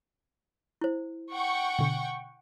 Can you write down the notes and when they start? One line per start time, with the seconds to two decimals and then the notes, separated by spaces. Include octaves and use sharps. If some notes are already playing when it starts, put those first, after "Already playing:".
0.81 E4 C5
1.32 F#5 G5 C#6
1.79 B2 D3